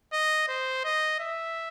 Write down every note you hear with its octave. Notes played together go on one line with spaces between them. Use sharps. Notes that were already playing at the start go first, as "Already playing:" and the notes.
D#5
C5
D#5
E5